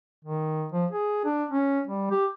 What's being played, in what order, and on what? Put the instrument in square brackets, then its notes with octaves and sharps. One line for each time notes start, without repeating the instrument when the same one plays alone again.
[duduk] D#3
F3
G#4
D4
C#4
G3
G4